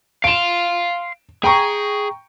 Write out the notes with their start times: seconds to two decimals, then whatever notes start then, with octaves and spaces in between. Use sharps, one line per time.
0.24 F5 C6 D7 E7
1.44 G#4 G5 A#5 C#6